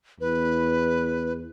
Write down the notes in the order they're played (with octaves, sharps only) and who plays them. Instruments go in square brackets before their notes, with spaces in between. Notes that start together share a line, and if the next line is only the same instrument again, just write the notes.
[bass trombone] E2 [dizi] B4